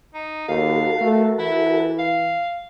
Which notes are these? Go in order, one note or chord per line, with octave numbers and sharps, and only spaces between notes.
D#4
D#2 F#4 A4 A#4 F5
A3
E3 E4
F5